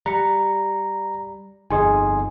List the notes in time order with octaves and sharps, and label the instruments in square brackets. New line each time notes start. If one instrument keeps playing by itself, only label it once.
[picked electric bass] G3 [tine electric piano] A#5 [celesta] F#6 C#7
[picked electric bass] G1 F2 [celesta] D#4 G#4 D#5 [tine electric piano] G#5 C6 D#6